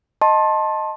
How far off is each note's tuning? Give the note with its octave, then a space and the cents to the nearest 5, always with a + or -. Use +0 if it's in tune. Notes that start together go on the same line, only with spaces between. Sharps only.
D#5 +0 A5 +0 C6 +30